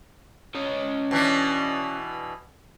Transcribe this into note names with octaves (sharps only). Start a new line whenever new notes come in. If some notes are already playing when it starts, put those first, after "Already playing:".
C#4 D#5
B2 E3 D4